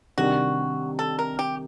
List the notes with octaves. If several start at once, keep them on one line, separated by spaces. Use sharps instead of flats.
C3 D#3 G3 D4 F#4
A4
A#4
G4